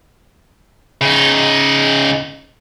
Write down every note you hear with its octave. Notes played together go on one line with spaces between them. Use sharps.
C#3 D#4